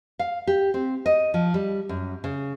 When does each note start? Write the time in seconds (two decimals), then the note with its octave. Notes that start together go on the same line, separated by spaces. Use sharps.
0.19 F5
0.47 G4
0.74 C4
1.06 D#5
1.34 F3
1.54 G3
1.89 F#2
2.24 C#3